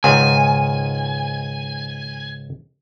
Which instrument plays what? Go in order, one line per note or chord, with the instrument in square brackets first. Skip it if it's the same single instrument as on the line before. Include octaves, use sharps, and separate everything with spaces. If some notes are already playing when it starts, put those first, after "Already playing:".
[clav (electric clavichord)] C#2 G#2 D#3 [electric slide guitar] G#5